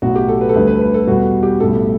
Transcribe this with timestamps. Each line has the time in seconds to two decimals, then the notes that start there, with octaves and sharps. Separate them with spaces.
0.02 B1 A2 F#3 F#4
0.16 G4
0.28 A4
0.41 B4
0.49 A4
0.54 D2 D3 G3 B4
0.67 B4
0.81 B4
0.94 A4
1.07 E2 B2 G3 F#4
1.43 G4
1.60 B1 A2 G3 A4